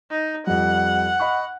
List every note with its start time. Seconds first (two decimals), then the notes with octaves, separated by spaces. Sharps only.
0.10 D#4
0.47 F2 G3 F#5
1.20 D#5 B5 C#6